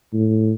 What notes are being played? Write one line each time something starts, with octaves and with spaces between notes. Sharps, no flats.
A2